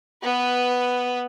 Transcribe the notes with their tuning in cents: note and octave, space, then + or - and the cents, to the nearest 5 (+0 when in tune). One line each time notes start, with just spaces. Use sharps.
B3 +0 B4 +5